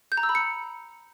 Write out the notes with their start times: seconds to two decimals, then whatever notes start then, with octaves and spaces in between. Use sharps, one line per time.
0.12 G6
0.17 A#5
0.23 E6
0.29 B5
0.35 C#7